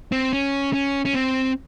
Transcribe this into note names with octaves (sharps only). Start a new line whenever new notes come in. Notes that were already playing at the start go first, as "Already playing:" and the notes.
C4
C#4
C#4
C#4
C4